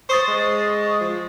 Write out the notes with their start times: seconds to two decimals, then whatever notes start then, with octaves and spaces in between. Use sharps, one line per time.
0.09 C5 C#6 D#6 A6
0.28 G#3
1.01 F3